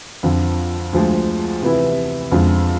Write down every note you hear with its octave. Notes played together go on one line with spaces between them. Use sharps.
F2 D3 F3
D2 D3 F3 G#3
C3 E3 B3 E4
F2 D3 F3 G#3